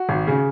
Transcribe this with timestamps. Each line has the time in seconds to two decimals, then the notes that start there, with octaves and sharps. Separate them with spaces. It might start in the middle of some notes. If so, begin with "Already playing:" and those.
Already playing: F#4
0.09 G#1
0.27 C#3